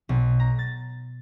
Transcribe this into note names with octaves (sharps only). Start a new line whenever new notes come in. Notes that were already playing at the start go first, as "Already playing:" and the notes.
B1
A#5
A6